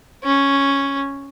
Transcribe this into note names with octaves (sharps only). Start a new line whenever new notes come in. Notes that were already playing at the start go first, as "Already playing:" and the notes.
C#4